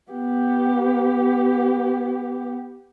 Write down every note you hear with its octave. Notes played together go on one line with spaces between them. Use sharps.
B3 G4